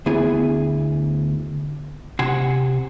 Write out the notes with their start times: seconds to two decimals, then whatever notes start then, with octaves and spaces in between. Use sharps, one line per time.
0.06 D2 B3 E4 G#4 G#5
2.19 C3 F#5 G#5 C6